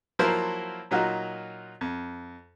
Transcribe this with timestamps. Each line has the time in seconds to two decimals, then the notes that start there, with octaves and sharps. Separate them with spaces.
0.19 F3 F#3 A#3 E4 A#4 C5
0.91 A#2 F#3 D#4 F4 F#4
1.81 F2